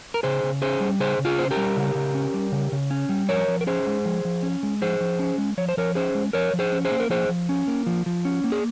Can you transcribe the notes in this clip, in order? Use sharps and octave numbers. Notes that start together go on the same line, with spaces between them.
A#4
C#3 G#4 C5
C#3
C#4 G#4 C5
G3
C#3 G#4 C5
C#3
F4 G#4
C#4 C5
G4 A#4
G3
C#3
C#3
C#4
G3
C#3
C#3
C#4
G3
F3 A#4 C#5
F3
A#4
C#4 G#4 C5
G#3
F3
F3
C#4
G#3
F3 G#4 C5
F3
C#4
G#3
F3 C#5
C5
F3 A#4 C#5
C#4 G#4 C5
G#3
F3 A#4 C#5
F3
G#4 C5
C#4
G#4 C5
A#3
A#4
F3 G#4 C5
F3
C#4
A#3
F3
F3
C#4
A#3
G#4